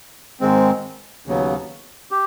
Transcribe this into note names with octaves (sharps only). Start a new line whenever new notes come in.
G#2 D#3 G#3 C4
D#2 C#3 F#3 B3
G4